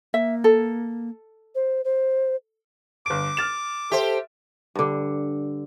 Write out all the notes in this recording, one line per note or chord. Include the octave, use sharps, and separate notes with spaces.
A#3 E5
A4
C5
C5
G1 D6 D7
F6 A6 E7
G4 A4 C5 E5
G2 D3